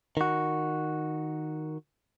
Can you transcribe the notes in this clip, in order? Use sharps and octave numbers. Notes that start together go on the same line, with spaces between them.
D#3 F#4